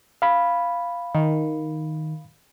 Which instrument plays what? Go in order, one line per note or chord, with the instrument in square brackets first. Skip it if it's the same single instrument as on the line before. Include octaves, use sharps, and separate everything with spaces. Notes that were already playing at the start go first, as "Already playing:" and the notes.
[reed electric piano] F5 B5
[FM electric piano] D#3